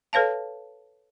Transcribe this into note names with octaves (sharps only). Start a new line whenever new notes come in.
A4 B4 C#5 F5 A5